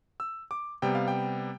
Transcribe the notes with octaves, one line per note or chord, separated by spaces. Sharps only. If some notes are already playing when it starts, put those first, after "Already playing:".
E6
D6
C3 G3 B3 G5
F5
G5